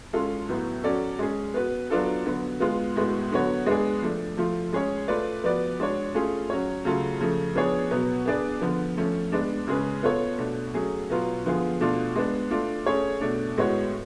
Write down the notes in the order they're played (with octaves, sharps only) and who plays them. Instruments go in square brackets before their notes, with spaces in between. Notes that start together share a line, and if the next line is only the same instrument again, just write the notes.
[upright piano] G#3 C#4 F4 A4
A2 F#3 B3
F#3 C#4 F#4 A4 D5
G#3 C#4 G#4
B3 F#4 B4
F#3 B3 D4 F4 A4
D3 F#3 B3
G#3 B3 F4
A2 G#3 B3 F#4
D3 F#3 B3 F#4 C#5
G#3 B3 D4 G#4
F3 A3 D4
F3 A3 F4
G#3 C#4 G#4 C#5
A3 F4 B4 D5
F3 B3 F#4 B4 D5
G#3 D4 F#4 C#5
A3 C#4 F4 G#4
F#3 C#4 F#4 C#5
C#3 F#3 A3 F4 A4
C#3 F3 A3
F3 B3 D4 G#4 C#5
B2 F#3 B3
B3 D4 G#4 B4 D5
D3 F3 B3
F3 A3 C#4
G#3 B3 D4
C#3 G#3 C#4 G#4 B4
B3 F4 A4 C#5
B2 A3 D4
F#3 A3 C#4 G#4
B2 F#3 B3 F4
D3 F3 B3 F4 G#4
B2 A3 D4 F4
G#3 B3 D4
A3 D4 F4
A3 C#4 G#4 C#5
B2 A3 D4
A2 G#3 B3 F#4 C#5